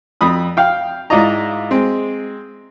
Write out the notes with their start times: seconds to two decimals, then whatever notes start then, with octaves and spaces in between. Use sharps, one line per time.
0.21 F2 B5 D#6
0.57 F5 G5
1.10 G#2 E4 F4 D5 D#5 A#5
1.71 G#3 C4